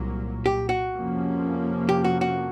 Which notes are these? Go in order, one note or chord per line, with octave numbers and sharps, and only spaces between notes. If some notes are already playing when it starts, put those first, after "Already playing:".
Already playing: C2 A#2 F#3 A#3
G4
F#4
F2 C3 F3 A#3 C#4
G4
F#4
F#4